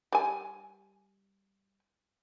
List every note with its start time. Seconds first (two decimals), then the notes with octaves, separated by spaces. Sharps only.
0.12 G3 G#5